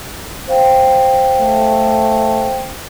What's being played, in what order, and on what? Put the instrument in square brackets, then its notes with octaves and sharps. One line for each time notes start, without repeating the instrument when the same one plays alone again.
[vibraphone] C5 F5 G5
[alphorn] A3